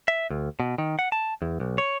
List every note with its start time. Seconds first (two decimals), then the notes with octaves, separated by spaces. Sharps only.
0.08 E5
0.30 D2
0.60 B2
0.78 D#3
0.99 F#5
1.12 A5
1.42 E2
1.60 B1
1.78 C#5